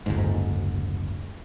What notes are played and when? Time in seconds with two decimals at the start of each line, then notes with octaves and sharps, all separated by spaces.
0.06 F#1 D2 G#2